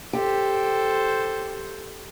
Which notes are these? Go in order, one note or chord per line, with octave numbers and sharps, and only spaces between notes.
G4 A4 C5